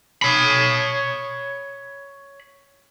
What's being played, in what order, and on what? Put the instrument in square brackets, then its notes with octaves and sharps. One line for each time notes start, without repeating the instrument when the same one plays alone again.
[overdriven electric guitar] C#5 B5